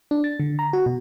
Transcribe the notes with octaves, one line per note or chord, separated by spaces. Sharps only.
D4
A6
D3
A#5
F#4
B2